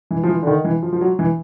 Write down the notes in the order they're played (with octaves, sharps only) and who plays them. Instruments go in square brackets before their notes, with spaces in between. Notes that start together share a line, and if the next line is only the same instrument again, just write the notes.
[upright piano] E3
F3
E3
D3
D#3
E3
F3
F3
F#3
E3